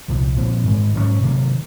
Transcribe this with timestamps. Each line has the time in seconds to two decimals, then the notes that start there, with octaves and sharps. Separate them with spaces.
0.08 C2 A#2 F3
0.37 A#2 F3 C4
0.65 G#2 D#3 G#3
0.94 G#2 F#3 A#3 C#4
1.22 C3 D#3 F#3 A#3